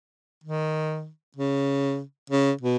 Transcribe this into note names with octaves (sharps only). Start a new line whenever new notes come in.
D#3
C#3
C#3
B2